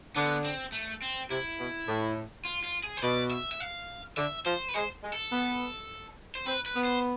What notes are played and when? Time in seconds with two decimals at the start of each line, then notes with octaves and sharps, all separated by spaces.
0.16 D3 B3
0.44 C4
0.72 A3
1.02 C4
1.30 C3 E4
1.59 B2
1.87 A2
2.45 F4
2.64 F4
2.84 G#4
2.97 C5
3.02 B2 D5
3.31 E5
3.52 E5
3.60 F5
4.17 D3 E5
4.46 F3 C5
4.69 B4
4.74 G#3 C5
5.03 G#3
5.13 A4
5.32 B3
6.35 C5
6.46 C4 B4
6.66 B4
6.75 B3
6.85 C5